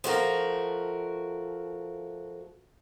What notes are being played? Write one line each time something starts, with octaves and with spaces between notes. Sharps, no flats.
F3 A3 F#4 A#4